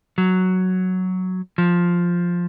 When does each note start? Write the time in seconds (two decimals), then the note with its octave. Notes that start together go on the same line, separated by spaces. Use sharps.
0.18 F#3
1.58 F3